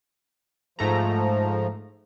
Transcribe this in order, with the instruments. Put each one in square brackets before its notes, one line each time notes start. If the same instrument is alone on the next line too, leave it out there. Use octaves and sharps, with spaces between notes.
[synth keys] G#2 A3 A#5 [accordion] F3